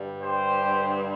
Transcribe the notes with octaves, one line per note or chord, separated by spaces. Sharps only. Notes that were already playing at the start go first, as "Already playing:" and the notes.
Already playing: G2 D3 G3
G4 C5